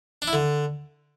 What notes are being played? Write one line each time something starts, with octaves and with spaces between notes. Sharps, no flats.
D4
E4
D3